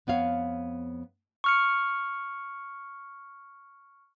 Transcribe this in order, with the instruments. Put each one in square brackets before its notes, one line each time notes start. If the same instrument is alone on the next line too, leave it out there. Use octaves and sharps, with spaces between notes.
[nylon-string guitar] F2 B3 C#5 F5
[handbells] C#6 F6 C#7